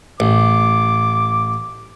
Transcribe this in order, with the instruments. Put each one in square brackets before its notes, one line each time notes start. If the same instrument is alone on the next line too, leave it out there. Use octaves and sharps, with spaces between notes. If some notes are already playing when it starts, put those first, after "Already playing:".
[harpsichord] A1 [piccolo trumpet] D6